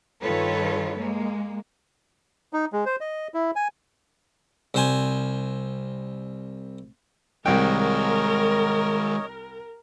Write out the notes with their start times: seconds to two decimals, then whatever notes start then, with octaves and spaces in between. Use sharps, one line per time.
0.22 G2 D#3 F4 A4 B4 C#5
0.98 G#3 A#3
2.53 D#4
2.73 G#3
2.86 C5
3.01 D#5
3.34 E4
3.56 G#5
4.74 C2 C5 G#5
7.46 C2 D#3 G#3 A#4 C#5 D#5 G5